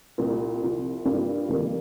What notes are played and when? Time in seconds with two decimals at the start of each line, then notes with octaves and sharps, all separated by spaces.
0.18 C2 A#2 G3
0.62 C2 C3 F3
1.05 G2 G3 A#3 F4
1.48 F1 F2 D#3 G3 A#3